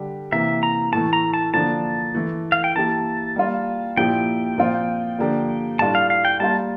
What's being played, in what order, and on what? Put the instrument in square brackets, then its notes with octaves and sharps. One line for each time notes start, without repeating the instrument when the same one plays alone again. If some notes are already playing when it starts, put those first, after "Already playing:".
Already playing: [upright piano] D3 G3 D4 G4
[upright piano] C3 E3 A#3 [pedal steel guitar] E5
[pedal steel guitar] A#5
[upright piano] A2 E3 A3 [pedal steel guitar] A5
[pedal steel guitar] A#5
A5
[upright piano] D3 F3 A#3 D4 [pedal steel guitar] A5
[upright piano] E3 A3 E4
[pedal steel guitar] F5
G5
[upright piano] E3 A#3 E4 G4 [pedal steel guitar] A5
[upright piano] G3 A#3 F4
[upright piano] A#2 F3 A#3 E4 G4 [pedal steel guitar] G5
[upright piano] A#2 F3 C4 F4
D3 F3 A#3 D4 G4
[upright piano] A2 G3 D4 F4 [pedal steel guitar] A5
[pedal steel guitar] F5
F5
G5
[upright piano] G3 A#3 F4 [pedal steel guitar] A5